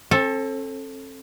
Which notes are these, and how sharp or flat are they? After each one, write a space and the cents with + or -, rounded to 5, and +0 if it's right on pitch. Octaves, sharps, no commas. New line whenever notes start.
C4 +40 A4 +0